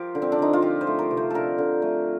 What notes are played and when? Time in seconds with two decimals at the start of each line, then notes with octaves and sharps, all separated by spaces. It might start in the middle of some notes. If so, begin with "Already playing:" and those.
Already playing: F3 G4 A#4 C5
0.15 D3
0.22 C4
0.32 D4
0.39 D3 D#4
0.53 F4
0.62 F3 G4
0.81 C5
0.87 A3
0.99 A#4
1.11 C3
1.17 C5
1.30 D3 A4 A#4
1.58 D3
1.82 A3